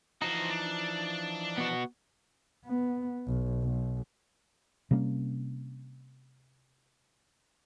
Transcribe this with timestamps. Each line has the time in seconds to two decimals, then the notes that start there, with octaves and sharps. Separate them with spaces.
0.22 E3 F3 D#4 F#4 C5
0.50 D4
1.58 B3 F#4
2.65 B3
3.27 B1
3.63 B1
4.91 C3 G3 A#3 C#4